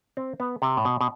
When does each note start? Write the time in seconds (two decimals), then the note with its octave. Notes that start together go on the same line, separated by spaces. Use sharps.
0.17 C4
0.40 B3
0.62 C3
0.77 A2
0.85 B2
1.01 B2